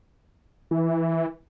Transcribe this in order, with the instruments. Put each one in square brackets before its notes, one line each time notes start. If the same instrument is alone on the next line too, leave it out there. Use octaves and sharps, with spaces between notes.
[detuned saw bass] E3